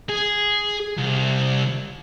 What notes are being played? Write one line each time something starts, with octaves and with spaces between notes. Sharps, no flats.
G#4
C2